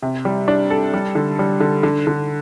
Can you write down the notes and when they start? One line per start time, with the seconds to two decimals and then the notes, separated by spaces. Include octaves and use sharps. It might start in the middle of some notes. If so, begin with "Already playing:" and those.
0.02 C3
0.25 G3
0.48 D4
0.70 A4
0.94 G3
1.15 D3
1.39 G3
1.60 D3
1.83 D3
2.07 D3